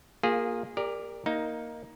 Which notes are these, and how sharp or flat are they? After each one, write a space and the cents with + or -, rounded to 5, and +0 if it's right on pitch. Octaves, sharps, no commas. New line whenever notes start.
A#3 +0 F4 +25 G#4 -15
G4 +35 A#4 +0 D5 +0
A#3 +0 D#4 +10